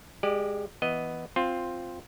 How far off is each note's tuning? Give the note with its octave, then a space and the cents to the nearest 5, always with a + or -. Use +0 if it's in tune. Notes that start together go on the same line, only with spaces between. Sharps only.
G#3 -10 G4 -5 D5 +25
E3 +0 B3 +0 D#5 +0
C4 +0 F4 +5